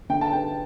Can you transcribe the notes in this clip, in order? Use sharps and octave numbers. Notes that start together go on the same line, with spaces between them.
D3 G5
A5
B3 G5